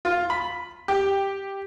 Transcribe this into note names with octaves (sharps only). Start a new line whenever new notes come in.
F4
B5
G4